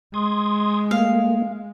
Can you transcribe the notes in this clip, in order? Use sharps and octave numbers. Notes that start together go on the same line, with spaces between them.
G#3 C6 D#6 G#6
A3 A#3 F5